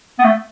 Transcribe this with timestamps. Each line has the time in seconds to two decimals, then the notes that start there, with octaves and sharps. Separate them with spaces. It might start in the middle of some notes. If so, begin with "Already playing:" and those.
0.19 B3
0.24 A3